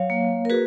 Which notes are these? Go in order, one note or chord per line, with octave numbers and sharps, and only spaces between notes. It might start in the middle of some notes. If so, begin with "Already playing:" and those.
Already playing: F#3 C#5 F5
A#3
A#4
F#4 G#4 B4